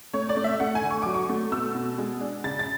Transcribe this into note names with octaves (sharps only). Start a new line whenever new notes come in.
A3 C#5
D5
A3
E5
A3 F#5
G#5
D3
C#6
F#3 D6
C#6
A3
B2 E6
B2
G#3
D4
C#3 A6
A6